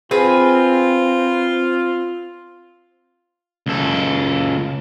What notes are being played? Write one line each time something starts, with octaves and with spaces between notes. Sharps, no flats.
C4 F4 G#4 B4
C#2 A4